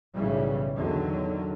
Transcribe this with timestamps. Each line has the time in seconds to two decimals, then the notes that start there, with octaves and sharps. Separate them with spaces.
0.14 B1 A2 C#3 E3 G3
0.74 E2 D3 D#3 F#3